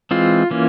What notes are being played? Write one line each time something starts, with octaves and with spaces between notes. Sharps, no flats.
E3 G#3 C4 F4
E3 A#3 C#4